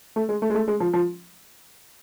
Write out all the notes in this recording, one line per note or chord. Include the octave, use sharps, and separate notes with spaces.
A3
G#3
A3
G#3
A3
G#3
F3
F3